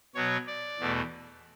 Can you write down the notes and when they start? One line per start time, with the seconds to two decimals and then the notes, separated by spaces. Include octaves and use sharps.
0.15 B2 F#3 B3 C#5
0.47 D5
0.80 E2 B2 A3